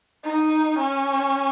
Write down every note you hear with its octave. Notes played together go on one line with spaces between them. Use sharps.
D#4
C#4